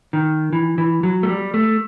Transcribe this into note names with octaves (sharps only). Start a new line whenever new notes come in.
D#3
E3
E3
F#3
A3
G3
A3